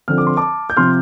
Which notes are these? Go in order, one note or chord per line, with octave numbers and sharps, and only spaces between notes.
D3 F3 C4 F6
D6
C6
A5 D6
G6
C3 F3 C6 F6